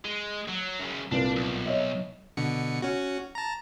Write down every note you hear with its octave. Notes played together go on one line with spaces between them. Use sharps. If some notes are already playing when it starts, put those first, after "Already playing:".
G#3
F#3
F#2 C#3
C2 A#2 D4 B4
B1
C#5 D#5 E5
B2 D3 C#7
C#4 F#4
A5 A#5